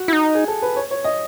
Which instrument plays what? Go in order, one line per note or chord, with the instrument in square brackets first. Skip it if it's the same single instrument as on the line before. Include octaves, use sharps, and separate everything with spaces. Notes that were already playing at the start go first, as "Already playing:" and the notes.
Already playing: [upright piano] F#4
[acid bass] E4
D#4
[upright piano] G#4
A4
B4
C#5
C#5
D#5